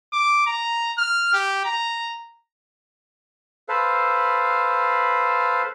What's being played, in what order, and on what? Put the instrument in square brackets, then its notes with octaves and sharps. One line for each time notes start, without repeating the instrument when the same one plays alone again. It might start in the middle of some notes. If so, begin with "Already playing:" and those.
[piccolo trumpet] D6
A#5
F6
G4
A#5
[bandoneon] A4 B4 C5 F5